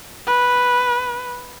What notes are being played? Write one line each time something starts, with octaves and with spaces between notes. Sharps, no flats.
B4